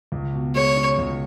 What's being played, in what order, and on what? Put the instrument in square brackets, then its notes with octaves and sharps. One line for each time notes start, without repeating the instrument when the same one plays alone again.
[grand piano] C#2
B2
[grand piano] G#3 [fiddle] C#5
[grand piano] C#4
C#2